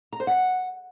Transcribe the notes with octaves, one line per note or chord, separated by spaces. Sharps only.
A#5
C5
F#5